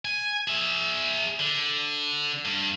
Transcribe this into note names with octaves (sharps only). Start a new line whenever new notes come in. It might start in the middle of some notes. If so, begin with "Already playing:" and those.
G#5
G#4 E5
D3
G2